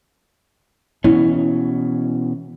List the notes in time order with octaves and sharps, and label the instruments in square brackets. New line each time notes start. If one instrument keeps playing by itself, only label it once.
[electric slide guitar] B2 E3 C#4 [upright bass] E4